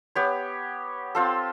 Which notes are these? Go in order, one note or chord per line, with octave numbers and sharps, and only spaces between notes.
B3 G4 C#5
C4 F4 A4